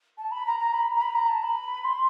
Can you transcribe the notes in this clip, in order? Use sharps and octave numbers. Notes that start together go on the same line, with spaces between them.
A5
B5
A#5
A#5
B5
A#5
B5
A#5
A5
B5
C6